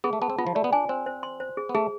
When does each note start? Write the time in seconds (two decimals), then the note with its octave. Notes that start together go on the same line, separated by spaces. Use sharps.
0.04 B3 G#4
0.13 A3
0.22 B3 A5
0.30 C4
0.39 B3 F4
0.47 F3
0.55 A3 D5
0.64 B3
0.72 D4 G#5
0.89 C4 C5
1.06 C5
1.23 C6
1.40 C5
1.57 G#4
1.69 B3
1.75 A3 G#4